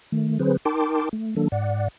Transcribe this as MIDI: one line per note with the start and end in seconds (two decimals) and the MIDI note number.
0.12 0.38 51
0.12 0.38 57
0.39 0.57 50
0.39 0.57 54
0.39 0.57 60
0.39 0.57 68
0.39 0.57 71
0.39 0.57 72
0.65 1.09 63
0.65 1.09 70
0.65 1.09 79
0.65 1.09 81
0.65 1.09 84
0.65 1.09 86
1.13 1.35 57
1.36 1.48 51
1.36 1.48 54
1.36 1.48 58
1.36 1.48 62
1.36 1.48 69
1.52 1.88 44
1.52 1.88 74
1.52 1.88 78